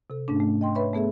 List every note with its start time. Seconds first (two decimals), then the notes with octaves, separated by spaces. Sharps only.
0.10 C3 A4
0.28 G#2 A3 C#4 D4
0.40 A3
0.61 D#5 G5 C6
0.75 B4 C#5 E5 B5 C#6
0.94 A3 B3 G#4 A4 E5